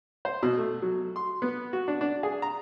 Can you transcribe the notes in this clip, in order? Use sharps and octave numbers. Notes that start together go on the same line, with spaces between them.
C5
B2
A3
F#3
C6
B3
F#4
D4
D4
G#4
A#5